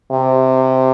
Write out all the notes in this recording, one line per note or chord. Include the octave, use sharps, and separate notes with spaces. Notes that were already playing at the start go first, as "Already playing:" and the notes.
C3